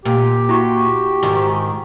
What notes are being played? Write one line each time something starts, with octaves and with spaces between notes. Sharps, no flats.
A#2 G4
E4 F#4 C#6
G#2 D#3